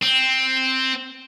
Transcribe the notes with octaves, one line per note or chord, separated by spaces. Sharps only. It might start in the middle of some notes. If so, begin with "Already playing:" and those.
C4